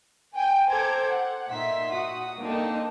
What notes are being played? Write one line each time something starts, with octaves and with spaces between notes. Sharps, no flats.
G5 G#5 G6
A4 C5 A#5 D6 G6 G#6
F#5
A#2 D#4 E5 C6 B6
F#4 F#5 D#6
A#3 C4 D4 D#4 A4